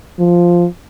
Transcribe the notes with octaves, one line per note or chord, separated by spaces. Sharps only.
F3